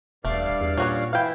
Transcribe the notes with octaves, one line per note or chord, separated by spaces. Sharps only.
E1 G2 A3 D5 F5
E2
A#2 C#4 F#4 C#5
E3 E4 F5 G5